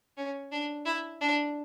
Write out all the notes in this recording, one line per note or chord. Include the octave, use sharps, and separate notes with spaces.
C#4
D4
E4
D4